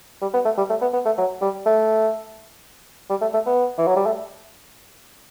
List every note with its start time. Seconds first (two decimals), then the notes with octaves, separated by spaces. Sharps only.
0.22 G3
0.34 B3
0.45 A3
0.58 G3
0.70 A3
0.81 B3
0.93 B3
1.05 A3
1.18 F#3
1.41 G3
1.66 A3
3.10 G3
3.21 A3
3.34 A3
3.46 B3
3.78 E3
3.87 F#3
3.96 G3
4.06 A3